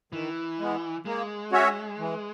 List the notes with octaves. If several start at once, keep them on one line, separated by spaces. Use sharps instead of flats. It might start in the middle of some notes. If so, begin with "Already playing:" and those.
D#3 E3
G#3 B3
G#3 A#3
C#4 F#4 C#5 E5
E3